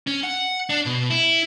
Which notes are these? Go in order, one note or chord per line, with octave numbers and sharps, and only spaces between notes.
C#4
F#5
D4
B2
E4